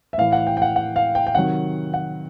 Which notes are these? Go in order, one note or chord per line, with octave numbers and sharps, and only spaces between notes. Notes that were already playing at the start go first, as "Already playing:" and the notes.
E5
A2 E3 F5
F#5
G5
G5
F#5
F#5
F5
G5
G5
C3 D#3 F#3 F#5
F#5